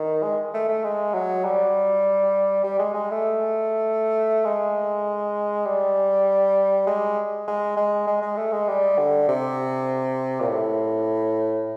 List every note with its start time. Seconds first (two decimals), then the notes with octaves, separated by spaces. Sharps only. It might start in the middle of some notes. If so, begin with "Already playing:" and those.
Already playing: D#3
0.23 G#3
0.54 A3
0.69 A3
0.84 G#3
1.14 F#3
1.45 G3
2.64 G3
2.79 G#3
2.94 G#3
3.10 A3
4.45 G#3
5.65 G3
6.87 G#3
7.47 G#3
7.77 G#3
8.07 G#3
8.22 G#3
8.37 A3
8.52 G#3
8.68 G3
8.98 D3
9.28 C3
10.40 A#2
10.48 A2